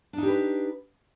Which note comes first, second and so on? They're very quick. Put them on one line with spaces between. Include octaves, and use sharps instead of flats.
D4 D#4 G4 B4